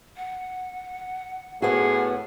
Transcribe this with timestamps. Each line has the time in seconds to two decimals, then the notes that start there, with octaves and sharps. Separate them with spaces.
0.17 F#5
1.62 A2 B3 F#4 G#4